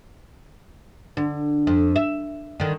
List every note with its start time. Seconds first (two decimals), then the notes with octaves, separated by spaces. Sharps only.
1.17 D3
1.67 F2
1.96 E5
2.60 D3 D#3